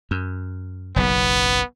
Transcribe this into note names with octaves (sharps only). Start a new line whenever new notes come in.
F#2
F#1 B1 C#3 B3